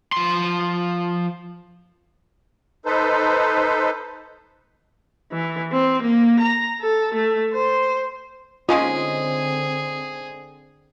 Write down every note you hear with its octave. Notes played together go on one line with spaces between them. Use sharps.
F3 C6
D#4 A4 B4 C5
E3
C4
A#3
A#5
A4
A3
C5
D3 G#3 C4 C#4 D#4 F4 G#4